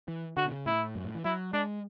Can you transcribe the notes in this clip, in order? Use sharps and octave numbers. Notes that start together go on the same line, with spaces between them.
E3
D3 F#4
B2
C#3
A2 E4
F#2
A2
E3
F#3 E4
G#3 D4